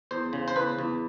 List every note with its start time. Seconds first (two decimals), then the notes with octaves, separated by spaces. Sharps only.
0.11 E2 C5
0.33 C#3
0.48 C5
0.56 E2 B4
0.79 E2